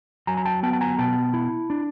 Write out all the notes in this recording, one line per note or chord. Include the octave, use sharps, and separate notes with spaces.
F#3 G#5 A#5
A#5
G5 A5
B3 G5 A5
A5
G#5 A#5
B2 G5 A5
E4
D4